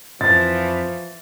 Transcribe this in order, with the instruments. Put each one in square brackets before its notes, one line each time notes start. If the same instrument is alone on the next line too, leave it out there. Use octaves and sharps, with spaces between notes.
[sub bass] F2 [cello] E3 [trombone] F3 [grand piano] A6